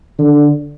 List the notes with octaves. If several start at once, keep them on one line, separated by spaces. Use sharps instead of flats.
D3